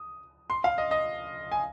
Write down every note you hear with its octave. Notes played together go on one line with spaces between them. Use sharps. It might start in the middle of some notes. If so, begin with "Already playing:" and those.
Already playing: D#6
C6
F5
D#5
D#5
G#5